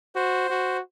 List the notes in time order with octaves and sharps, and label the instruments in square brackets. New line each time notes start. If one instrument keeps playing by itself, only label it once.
[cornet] F#4 [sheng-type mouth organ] C5
[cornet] F#4